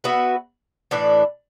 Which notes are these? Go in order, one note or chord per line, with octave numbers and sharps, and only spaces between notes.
B3 F#4 B4 E5
A2 E3 D4 B4